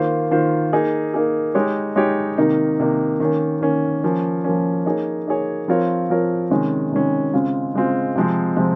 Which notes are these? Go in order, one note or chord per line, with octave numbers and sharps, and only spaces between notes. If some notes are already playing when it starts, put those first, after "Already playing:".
Already playing: D#3 A#3 F4 C5
D#3 A#3 F4 C5
A#3 D#4 G#4
A#3 D#4 G#4
G#3 D#4 G4 C#5
G#3 D#4 G4 C#5
C3 D#3 A#3 D#4
C3 D#3 A#3 D#4
D#3 A#3 C#4
D#3 A#3 C#4
F3 A#3 C#4
F3 A#3 C#4
A#3 D#4 G#4 C#5
A#3 D#4 G#4 C#5
F3 C4 F4 A#4 C#5
F3 C4 F4 A#4 C#5
C3 D#3 G#3 C#4
C3 D#3 G#3 C#4
C#3 G#3 C4 F4
C#3 G#3 C4 F4
C3 F3 G#3 C4
C3 F3 G#3 C4